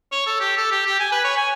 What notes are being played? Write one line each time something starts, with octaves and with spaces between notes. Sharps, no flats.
C#5
A4
G4
A4
G4
G4
G#5
B4
C#5
G#5